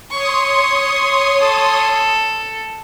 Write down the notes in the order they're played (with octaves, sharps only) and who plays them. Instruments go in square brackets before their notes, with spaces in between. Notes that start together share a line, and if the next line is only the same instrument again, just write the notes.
[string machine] C#5 C6 D#6 [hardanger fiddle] C#6
[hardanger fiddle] A4